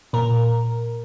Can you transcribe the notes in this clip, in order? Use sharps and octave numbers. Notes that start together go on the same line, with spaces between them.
A#2 A#4